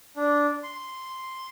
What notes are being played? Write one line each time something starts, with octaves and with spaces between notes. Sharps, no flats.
D4
C6